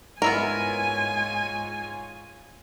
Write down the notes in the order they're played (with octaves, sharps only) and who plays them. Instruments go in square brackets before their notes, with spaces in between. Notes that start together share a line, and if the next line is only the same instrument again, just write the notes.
[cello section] G#2 F4 C#5 [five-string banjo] B3 E4 A#4 [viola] G#5